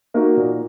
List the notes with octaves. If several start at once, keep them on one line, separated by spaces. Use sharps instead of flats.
A#3 D#4 F#4
A#2